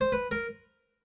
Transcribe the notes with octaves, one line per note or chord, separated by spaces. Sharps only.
C5
B4
A#4